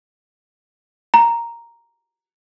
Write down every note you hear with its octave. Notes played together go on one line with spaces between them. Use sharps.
A#5